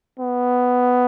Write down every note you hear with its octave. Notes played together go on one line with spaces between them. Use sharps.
B3